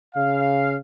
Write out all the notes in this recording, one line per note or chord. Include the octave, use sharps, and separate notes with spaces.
C#3 F5